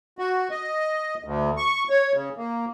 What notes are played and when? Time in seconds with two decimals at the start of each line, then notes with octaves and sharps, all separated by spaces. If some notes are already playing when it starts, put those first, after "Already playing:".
0.19 F#4
0.51 D#5
1.24 D2
1.57 C#6
1.90 C#5
2.14 C#3
2.37 A#3